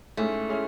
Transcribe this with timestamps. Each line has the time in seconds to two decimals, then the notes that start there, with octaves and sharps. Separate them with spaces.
0.17 G#2 G#3 A3 C#4 E4
0.49 G#3 C#4 E4